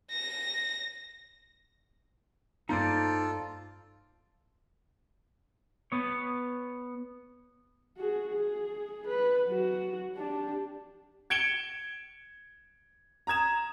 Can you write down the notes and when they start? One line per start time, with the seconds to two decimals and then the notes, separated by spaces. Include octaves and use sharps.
0.12 A#6
2.69 G2 A#3 B3 D#4 F4 A4 C5 D5
5.92 B3 C#5
7.97 F#4 G#4
8.33 G#4
9.07 B4
9.46 F#3 F#4
10.16 D4 G4
11.30 G#6 C#7 D7 E7 G7
13.27 A#5 D#6 G#6 E7